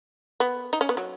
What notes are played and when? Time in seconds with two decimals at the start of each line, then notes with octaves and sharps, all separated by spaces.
0.40 B3
0.73 D#4
0.81 C#4
0.89 B3
0.97 F#3